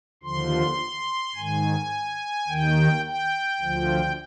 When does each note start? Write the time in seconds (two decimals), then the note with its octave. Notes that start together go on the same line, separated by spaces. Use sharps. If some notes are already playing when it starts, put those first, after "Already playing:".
0.23 D#2 D3 F3 C6
1.35 G#2 D#3 G#5
2.48 D#2 D#3 G5
3.05 G5
3.61 D2 D3 F3